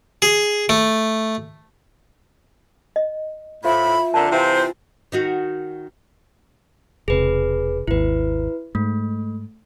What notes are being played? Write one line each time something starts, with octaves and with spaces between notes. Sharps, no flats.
G#4
A3
D#5
A2 F4 C5 E5 B5
F2 D3 A#4 A5 A#5
C3 E3 C4 E4 F4 C5 G#5
D#3 D#4 F#4
E1 C3 G#4 B4
G#1 D#2 E4 B4
G#2 A3